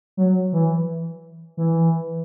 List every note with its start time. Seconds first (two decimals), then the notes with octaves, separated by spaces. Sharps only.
0.17 F#3
0.53 E3
1.57 E3